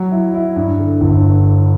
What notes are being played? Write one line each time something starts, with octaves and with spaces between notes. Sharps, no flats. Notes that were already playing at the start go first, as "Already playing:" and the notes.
Already playing: F#3
E4
E4
G2
D3
G1